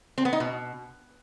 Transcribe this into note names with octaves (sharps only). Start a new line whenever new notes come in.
C4
B3
D#4
B2